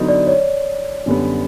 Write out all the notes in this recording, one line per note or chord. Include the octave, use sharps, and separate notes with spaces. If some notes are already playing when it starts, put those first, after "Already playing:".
Already playing: D3 F#3 B3 D#4
D5
C#5
F#2 D3 G3 B3